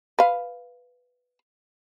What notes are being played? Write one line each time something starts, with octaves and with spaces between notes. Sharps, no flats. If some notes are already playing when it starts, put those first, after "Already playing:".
B4 F5